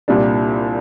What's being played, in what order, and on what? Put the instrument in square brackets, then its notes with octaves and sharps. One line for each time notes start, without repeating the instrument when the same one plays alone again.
[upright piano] C2 A#2 G3 D4